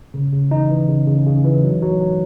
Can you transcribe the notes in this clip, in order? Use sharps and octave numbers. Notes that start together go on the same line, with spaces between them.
C#3
C#3
E3 D#4
E3
C#3
C#3
C#3
E3
F#3
F#3
F#3